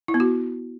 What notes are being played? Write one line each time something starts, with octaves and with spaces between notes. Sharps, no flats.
E4
B3
F#4